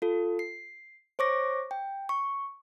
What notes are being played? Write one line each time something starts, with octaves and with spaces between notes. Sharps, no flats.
F4 A4
C7
C5 C#5 C#6 D6 A#6
G5
C#6